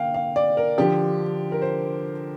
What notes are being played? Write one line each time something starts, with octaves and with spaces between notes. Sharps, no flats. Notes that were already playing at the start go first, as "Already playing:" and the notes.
Already playing: D3 A#3 F5 G5
F5
D5
A#4
D3 F3 D4 G4
A#4
C5